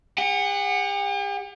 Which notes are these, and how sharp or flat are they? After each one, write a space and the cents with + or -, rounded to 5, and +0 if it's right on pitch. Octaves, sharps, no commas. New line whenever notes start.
G4 +45 F#5 +0